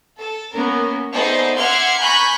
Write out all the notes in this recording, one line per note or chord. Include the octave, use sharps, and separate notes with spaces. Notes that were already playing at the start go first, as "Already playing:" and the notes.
A4
A#3 B3 C#4 A#4
A3 B3 D#4 G#4 C5 D5
E5 F#5 C6 D6 F6 G#6
G#5 A#5 B5 C#6 F#6 G6